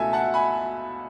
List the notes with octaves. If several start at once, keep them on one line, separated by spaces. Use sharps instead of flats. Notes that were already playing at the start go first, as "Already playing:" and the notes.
Already playing: C#2 B2 A3 A4 E5 G#5
F#5 A5
G#5 B5